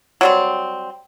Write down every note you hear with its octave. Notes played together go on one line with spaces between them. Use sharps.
F#3 G3 C4